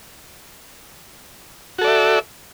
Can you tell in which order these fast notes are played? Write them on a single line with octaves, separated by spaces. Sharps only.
F#4 A4 D5 E5